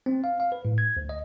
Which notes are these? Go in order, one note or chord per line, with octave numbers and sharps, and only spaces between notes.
C4
F5
F5
B4
A2
G#6
D2
D#5